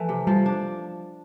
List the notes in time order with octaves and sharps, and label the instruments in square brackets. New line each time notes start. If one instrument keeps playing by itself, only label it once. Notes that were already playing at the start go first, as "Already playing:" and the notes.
Already playing: [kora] E3 A3 [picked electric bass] F3
[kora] C3
[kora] F3 [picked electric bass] G3
[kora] D4